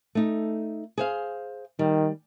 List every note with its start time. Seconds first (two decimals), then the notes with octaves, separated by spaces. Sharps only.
0.15 A3 D#4
0.98 G#4 C5 F5
1.79 D#3 G3